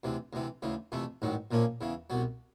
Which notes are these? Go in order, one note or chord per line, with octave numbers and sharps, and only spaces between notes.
D2 C3 E3
D2 C3 E3
D2 C#3 E3
F2 C3 E3 A3
A1 G#2 D#3 F#3
A#1 A#2 F3 A#3 C#4
E2 C#3 E3
C2 B2 F#3